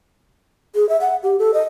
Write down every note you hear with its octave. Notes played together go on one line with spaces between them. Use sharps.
G#4
E5
F#5
G4
A4
D#5